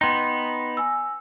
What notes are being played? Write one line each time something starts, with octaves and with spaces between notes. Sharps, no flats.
B3 D#4 G5 C6
G#5 E6